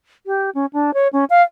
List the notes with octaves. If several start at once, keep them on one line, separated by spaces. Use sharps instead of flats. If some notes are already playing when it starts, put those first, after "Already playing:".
G4
C#4
D4
C#5
C#4
F5